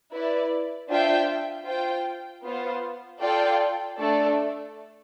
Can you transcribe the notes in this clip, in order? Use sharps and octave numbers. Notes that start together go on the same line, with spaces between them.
E4 B4 D5
D4 F4 C5 E5 G5
F4 C5 G5
B3 F4 C5
F4 A4 D5 G5
A3 D4 A4 D5